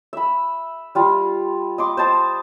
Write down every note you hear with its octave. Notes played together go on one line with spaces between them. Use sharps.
E5 B5
G3 F4
D#5 C6 D6
C5 D#5 A5 C6